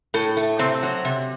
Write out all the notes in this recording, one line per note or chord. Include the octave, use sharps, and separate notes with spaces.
A2 A4
A3
C3 C4
F#3
C3